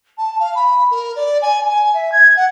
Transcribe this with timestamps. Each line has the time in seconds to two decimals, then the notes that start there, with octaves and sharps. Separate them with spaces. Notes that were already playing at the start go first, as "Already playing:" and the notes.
0.18 A5
0.40 F5
0.55 B5
0.91 A#4
1.16 D5
1.42 G#5
1.69 G#5
1.94 E5
2.12 G#6
2.36 F#5